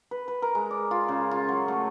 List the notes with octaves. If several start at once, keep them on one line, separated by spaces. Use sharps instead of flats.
B4
B4
A#4
G#3
D5
F4
C#3
F4
F#3
A3